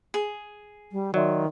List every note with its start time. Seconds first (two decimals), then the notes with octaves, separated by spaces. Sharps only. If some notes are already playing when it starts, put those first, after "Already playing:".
0.14 G#4
0.92 G3
1.14 D#3 F#3 D5 E5 C6